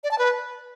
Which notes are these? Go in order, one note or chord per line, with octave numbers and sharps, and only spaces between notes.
D5
A5
B4